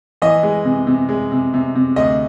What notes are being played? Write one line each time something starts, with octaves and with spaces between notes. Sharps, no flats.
E3 D#5
G#3
C3
C3
G#3
C3
C3
C3
D2 D#5